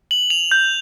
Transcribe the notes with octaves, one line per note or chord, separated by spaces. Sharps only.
F#7
F7
G6